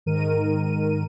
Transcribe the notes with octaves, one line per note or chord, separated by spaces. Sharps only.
G#2 D#3 A#4 D#7